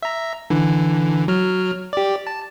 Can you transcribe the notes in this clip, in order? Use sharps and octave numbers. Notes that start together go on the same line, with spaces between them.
E5 A#5
D3 E3
F#3 F6
G4 D5
A5